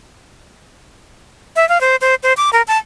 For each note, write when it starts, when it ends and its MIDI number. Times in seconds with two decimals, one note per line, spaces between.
1.56 1.68 76
1.69 1.80 77
1.81 1.96 72
2.01 2.15 72
2.23 2.33 72
2.37 2.50 86
2.53 2.62 70
2.68 2.78 81